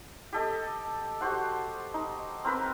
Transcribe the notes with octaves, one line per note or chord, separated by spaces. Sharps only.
G4 A4 D#5
F#4 G4 C5 F#5
D#4
C4 A#4 B4